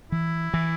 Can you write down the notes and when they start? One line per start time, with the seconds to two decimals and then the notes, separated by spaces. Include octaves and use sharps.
0.11 E3 E4
0.54 E3